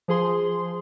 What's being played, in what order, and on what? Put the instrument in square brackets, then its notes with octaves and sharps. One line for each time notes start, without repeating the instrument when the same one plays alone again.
[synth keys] F3 G#4 C6